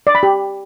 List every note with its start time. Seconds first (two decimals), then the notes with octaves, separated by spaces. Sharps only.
0.07 D5
0.15 B5
0.23 G4